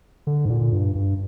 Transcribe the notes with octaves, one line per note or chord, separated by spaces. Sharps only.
D3
G#2
A#2
G2
G2